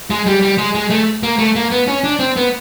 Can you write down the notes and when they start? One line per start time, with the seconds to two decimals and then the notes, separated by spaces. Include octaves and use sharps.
0.10 G#3
0.27 G3
0.42 G3
0.58 G#3
0.75 G#3
0.90 A3
1.23 A#3
1.38 A3
1.56 A#3
1.71 B3
1.88 C#4
2.04 D4
2.19 C4
2.36 B3